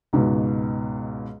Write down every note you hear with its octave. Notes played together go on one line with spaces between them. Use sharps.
C#2 G#2 B2